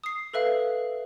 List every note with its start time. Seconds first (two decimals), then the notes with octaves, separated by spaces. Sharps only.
0.04 D#6 C7
0.33 A4 B4 E5 F5